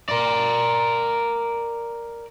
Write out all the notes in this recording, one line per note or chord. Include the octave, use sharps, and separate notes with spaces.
A#4 D5